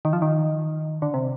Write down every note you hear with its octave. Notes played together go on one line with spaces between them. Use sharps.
D#3
F3
D#3
D3
C3